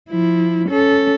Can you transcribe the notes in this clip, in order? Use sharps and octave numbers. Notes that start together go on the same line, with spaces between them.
F3 E4
C#4 A4